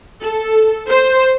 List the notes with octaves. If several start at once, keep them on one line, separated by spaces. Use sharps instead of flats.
A4
C5